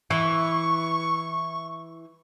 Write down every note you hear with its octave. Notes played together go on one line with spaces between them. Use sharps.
E3 C#6